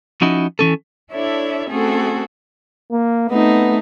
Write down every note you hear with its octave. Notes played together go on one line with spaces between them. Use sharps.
F3 C#4 D#4 E4 F#4
E3 C#4 A4
D4 E4 A4 C#5 D5 E5
A3 C4 C#4 F#4 G#4 A4
A#3
A3 B3 C4 D#4